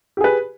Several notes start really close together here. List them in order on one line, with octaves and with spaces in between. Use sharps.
G4 G#4 B4